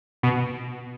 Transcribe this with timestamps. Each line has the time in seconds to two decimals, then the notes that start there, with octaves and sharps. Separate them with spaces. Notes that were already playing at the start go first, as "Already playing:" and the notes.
0.23 B2